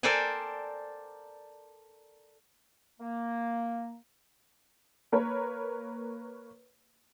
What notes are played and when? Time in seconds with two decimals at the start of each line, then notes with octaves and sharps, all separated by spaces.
0.03 A4 A#4 C5 D5 G5 G#5
3.00 A#3
5.12 A#3 A#4 B4 C#5